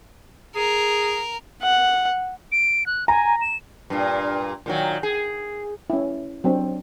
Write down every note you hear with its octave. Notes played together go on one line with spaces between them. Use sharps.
G#4 A#4
F#5
D7
F#6
G#5 A#5
E7
G2 A#2
A#2 D#3 F#3
G#4
C#4 E4
F#3 C4 D4